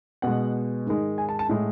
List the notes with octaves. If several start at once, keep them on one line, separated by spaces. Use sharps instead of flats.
B2 G#3 F#5
G#2 D#3 G#3
G#5
A5
A5
A2 G#3